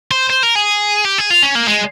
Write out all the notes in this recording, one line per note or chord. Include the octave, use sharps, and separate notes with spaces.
C5
C5
A#4
G#4
G4
G#4
F4
C#4
A#3
G#3